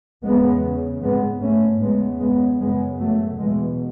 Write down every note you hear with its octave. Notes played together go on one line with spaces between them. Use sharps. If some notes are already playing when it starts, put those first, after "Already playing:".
E2 C#3 G#3 B3
G#2 G#3 B3
A3 C#4
E2 C#3 G#3 B3
G#3 B3
F#2 C#3 G#3 B3
F#3 A3
E2 B2 E3 G#3